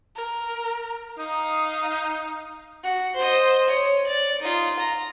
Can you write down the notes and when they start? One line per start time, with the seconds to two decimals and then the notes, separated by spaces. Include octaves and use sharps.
0.15 A#4
1.18 D#4 F5 D#6
2.83 F#4
3.15 C5 D#5
3.67 C#5
4.07 D5
4.42 D#4 F4
4.79 A#5